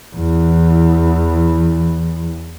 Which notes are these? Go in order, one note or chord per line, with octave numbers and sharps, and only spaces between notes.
E2 E3